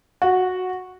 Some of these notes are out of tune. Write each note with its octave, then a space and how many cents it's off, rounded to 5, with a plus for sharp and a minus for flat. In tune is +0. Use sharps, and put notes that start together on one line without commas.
F#4 -10